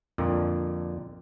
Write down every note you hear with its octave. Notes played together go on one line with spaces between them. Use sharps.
F2 A#2 D3